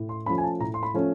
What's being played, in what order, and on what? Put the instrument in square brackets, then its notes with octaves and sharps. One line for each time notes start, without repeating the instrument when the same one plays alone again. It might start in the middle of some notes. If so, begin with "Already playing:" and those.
Already playing: [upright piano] A2
C6
F3 A3 C#4 B5
G#5
A5
A2 A#5
C6
B5
F3 A3 C#4